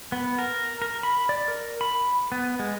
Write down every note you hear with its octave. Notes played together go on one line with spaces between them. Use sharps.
B3
A#4
A#4
B5
D5
A#4
B5
B3
G#3